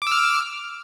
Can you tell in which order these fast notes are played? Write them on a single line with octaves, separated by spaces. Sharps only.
D6 E6 F6